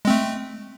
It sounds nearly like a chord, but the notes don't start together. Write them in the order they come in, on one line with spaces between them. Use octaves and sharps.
G#3 C4 A3